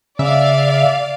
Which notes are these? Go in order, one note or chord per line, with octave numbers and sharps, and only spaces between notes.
C#3 D5 E5 F5